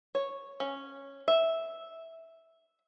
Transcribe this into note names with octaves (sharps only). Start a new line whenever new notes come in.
C#5
C#4
E5